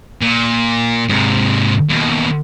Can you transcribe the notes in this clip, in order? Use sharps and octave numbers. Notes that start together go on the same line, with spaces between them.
A#2
G#2 C3
D#2 B2